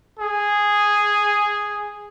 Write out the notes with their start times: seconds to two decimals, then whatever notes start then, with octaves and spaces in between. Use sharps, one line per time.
0.19 G#4